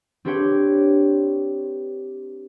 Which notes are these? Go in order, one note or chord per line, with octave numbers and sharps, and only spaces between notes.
C4 D4 G4 B4 C#5 G5